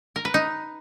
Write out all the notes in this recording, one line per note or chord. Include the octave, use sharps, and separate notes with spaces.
A#4
B4
D#4